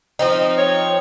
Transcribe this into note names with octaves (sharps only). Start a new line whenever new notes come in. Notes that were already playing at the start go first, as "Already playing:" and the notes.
F3 C4 D#4
C#5